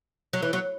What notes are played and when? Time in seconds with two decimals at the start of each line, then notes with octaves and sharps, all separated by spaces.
0.33 F#3
0.42 E3
0.53 F#3